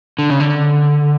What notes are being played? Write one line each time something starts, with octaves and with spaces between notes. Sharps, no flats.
D3
C#3
D3